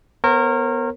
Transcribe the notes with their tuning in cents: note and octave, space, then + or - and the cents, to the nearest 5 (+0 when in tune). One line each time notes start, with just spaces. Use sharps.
B3 +0 A#4 -15 C#5 -45